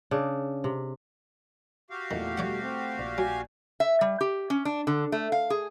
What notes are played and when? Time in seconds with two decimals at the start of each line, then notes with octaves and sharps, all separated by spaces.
0.11 C#3 D4
0.64 C3
1.90 F#4 G4 F5
2.11 E2 A#2 D#3 A3
2.38 B2 G3 A3 C#5 D5 F#5
2.61 A3 C4
2.98 A#1
3.18 F#3 G#5
3.80 E5
4.01 G3
4.21 G4
4.50 C#4
4.65 D4
4.87 D3
5.12 A3
5.32 F5
5.50 G#4